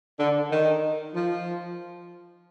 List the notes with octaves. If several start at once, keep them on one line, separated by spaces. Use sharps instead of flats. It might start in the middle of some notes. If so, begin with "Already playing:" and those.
D3
D#3
F3